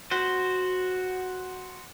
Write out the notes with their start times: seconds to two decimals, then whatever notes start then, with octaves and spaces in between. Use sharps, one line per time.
0.11 F#4 C5